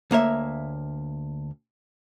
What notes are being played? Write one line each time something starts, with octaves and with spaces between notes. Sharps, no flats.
D2 A#3 C#5 E5